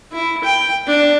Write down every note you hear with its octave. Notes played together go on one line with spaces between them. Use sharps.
E4
G5
D4